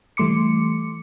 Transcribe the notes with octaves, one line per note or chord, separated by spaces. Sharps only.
E3 G3 A3 C6 D6 C#7